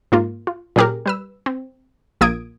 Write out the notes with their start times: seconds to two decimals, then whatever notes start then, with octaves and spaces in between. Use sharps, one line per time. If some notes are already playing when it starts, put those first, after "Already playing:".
0.12 G#2 A#3 F4
0.47 F4
0.76 A#2 F#3 C#4 G4 G#4 A#4
1.06 G3 B4 E6
1.46 C4
2.21 A#1 A#3 F4 D#6 G#6 D7